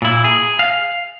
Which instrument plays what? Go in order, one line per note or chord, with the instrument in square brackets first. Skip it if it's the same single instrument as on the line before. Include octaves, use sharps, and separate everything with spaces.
[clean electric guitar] A#2 E4
G#4
F5